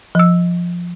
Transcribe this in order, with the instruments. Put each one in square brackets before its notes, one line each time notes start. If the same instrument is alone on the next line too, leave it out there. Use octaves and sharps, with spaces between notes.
[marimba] F3 E6